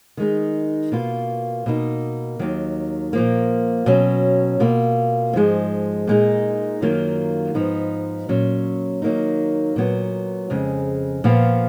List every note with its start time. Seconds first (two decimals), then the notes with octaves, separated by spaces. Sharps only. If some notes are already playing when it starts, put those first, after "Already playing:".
0.17 D#3 G#3 D#4
0.92 B2 A#3 F4
1.66 B2 A#3 D#4
2.39 D#2 D#3 F#3
3.13 A#2 F3 A#3
3.86 B2 F#3 C#4
4.60 B2 A#3 F4
5.33 G#2 F3 G#3
6.07 A#2 G#3 D#4
6.81 F#2 D#3 F#3 A#3 F4
7.54 G#2 F3 B3 D#4
8.29 A#2 F#3 C#4
9.02 D#3 F#3 A#3 D#4
9.76 A#2 F#3 B3
10.50 F2 C#3 G#3
11.24 A#2 F3 B3 F4